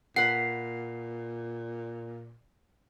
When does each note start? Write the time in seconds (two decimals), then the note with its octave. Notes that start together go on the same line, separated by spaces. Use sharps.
0.16 A#2 B4 F#5 C7